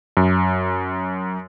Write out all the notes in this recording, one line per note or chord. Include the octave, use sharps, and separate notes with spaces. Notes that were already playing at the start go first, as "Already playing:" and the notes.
F#2